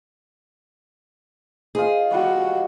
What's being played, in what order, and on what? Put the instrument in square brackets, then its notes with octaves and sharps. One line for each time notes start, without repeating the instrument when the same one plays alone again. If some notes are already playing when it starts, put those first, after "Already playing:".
[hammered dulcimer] F4 C5 D#5 [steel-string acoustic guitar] G#4
[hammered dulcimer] G3 [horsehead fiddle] F#4